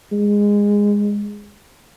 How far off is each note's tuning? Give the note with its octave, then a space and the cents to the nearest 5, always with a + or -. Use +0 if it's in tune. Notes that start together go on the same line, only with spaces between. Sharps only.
G#3 -15